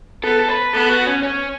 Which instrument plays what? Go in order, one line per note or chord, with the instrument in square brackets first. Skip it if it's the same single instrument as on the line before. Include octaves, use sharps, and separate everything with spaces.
[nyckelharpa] B3 [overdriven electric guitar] A4
[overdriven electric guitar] A4
B4
[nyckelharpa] B3 [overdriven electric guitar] A4
[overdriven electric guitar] F#4
C#4
C#4